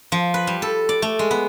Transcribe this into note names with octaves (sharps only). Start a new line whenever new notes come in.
F3
B4
G3
A4
D5
A3
G#3
B3